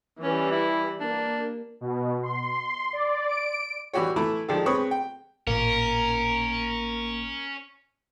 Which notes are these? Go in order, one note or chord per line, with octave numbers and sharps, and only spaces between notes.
E3 G3 C#4
E4
A#3 D4
B2
C6
D5
D7
E3 G3 F#4 G4 C#5
E3 A3 E4
D#3 F3 G#3 D4 G4 A4
G#3 C4 B4 C#5 C#6 D#6
G5
A1 A#2 A#3 C#4 A#4